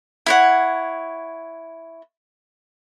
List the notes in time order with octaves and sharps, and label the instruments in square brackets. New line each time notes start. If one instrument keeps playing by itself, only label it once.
[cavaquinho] E4 C#5 F#5